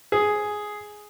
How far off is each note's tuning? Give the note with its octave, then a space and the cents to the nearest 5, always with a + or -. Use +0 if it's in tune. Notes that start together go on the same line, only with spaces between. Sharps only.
G#4 +5